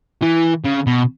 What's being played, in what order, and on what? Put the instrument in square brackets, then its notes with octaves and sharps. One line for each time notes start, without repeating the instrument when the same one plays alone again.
[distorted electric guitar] E3
C#3
B2